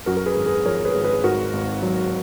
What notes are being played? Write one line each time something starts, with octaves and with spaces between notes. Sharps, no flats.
F#2 F#4 A#4
A#4
G#4 B4
G#1
G#4 B4
F3 A#4 C#5
G#4 B4
G#1
G#4 B4
G#2 F#4 A#4
G#1
F#3